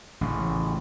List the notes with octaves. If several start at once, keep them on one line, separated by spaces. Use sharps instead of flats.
A1 C#3